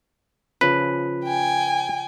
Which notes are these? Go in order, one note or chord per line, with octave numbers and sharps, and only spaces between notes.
C#3 F3 B4
G5 G#5